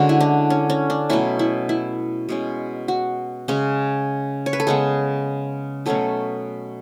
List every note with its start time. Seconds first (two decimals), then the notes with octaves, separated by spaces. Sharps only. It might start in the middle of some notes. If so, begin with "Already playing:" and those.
Already playing: D3 G#3 C#4 F#4
0.09 E4
0.20 D4
0.50 C#4
0.70 C#4
0.90 D4
1.10 B2 F#3 A3 C#4 E4
1.39 E4
1.69 E4
2.29 B2 G#3 C#4
2.88 F#4
3.48 C#3 G#3 C#4
4.46 C#5
4.53 B4
4.60 A4
4.67 C#3 G#3 B3 G#4
5.86 B2 F#3 A3 C#4 A4